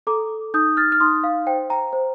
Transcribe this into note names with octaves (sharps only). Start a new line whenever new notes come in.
A4 A#5 D6
D#4 D#6 G6
F6 A6
F6
D#4 C6 D#6
F5
C5 G5
G5 A#5
C5